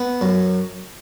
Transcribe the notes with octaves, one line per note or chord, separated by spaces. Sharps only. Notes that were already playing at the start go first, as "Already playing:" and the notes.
Already playing: B3
F#2